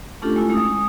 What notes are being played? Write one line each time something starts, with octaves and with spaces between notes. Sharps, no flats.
A3 C#4 D4 F4 G4 A4
G#3 A3 E4
G#3 C#4 D#6